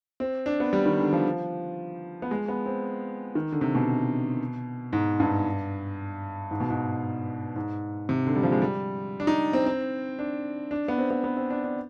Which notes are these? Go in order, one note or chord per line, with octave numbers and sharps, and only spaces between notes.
C4
D4
B3
G3
D#3
D3
F3
B3
G#3
B3
C4
D#3
D3
C3
B2
G#2
G2
G#2
B2
G#2
G#2
C3
D3
G3
F3
G#3
G3
D4
D#4
C4
C4
D4
D4
B3
C4
B3
B3
C4
D4
D4